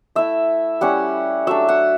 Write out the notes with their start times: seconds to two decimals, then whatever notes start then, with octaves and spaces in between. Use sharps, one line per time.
0.15 A3 E4 E5
0.81 G3 C#4 E4 F#5
1.47 F#3 A3 D4 E5
1.69 F#5